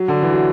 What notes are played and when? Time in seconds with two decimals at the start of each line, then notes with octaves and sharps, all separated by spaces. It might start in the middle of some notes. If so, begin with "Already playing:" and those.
Already playing: F#3
0.08 D3
0.22 E3
0.32 F#3